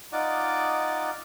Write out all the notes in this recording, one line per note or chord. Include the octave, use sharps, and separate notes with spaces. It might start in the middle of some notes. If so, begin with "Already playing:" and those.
D#4 F4 D5 D#5 F#5 D6